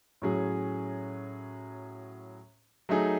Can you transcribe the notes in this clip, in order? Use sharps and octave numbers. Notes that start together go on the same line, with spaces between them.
A2 F#3 C#4 G#4
F#3 A3 D#4 G#4